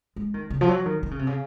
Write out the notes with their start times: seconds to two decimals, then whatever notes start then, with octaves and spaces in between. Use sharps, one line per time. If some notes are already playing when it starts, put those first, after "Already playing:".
0.16 G#3
0.34 D#3
0.50 C#3
0.61 F3
0.69 F#3
0.86 D#3
1.03 D#3
1.11 C#3
1.19 C3
1.27 C#3